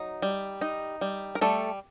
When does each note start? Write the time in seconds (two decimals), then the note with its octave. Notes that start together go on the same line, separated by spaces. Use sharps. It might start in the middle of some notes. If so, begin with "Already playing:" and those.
Already playing: F#3 D#4
0.22 G3
0.61 D#4
1.01 G3
1.35 A#4
1.41 G3 A3 A4